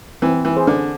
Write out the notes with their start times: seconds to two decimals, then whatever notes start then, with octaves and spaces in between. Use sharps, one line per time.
0.22 E3 C4
0.45 E3
0.56 G#4 C5
0.67 D3